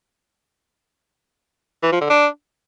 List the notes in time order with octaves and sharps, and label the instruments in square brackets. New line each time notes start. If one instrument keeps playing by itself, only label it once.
[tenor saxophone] E3
F3
D3
D4